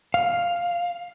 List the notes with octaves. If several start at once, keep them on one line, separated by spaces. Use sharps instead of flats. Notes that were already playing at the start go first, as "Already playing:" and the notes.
F5